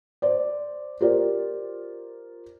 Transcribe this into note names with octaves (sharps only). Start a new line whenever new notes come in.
C5 D5
F4 G4 A#4 C5 D5